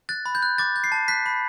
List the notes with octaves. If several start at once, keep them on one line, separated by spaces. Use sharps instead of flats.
F#6 A6
B5
G6
F#6
D6 A6
G6
C7
A5
F#6 B6
B5